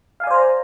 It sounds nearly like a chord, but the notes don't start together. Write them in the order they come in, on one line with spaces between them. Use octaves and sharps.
F5 G#5 D5 C5 A#5